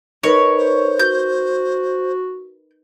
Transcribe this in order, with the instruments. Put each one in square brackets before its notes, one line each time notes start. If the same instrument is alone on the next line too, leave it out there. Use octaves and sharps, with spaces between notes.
[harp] D#4 A#4 B4 [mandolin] C#5
[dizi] C5
[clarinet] F#4 [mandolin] G6